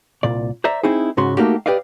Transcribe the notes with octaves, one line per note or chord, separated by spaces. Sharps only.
C2 A#2 D5
C5 D5 E5 A#5
C4 D#4 E4 G#4
G#2 C#3 F#4 C6
A3 A#3 D#4 F#4 G4
G4 B4 D5 D#5 F5